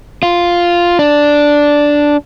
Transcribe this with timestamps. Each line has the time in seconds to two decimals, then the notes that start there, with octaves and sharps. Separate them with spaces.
0.23 F4
0.99 D4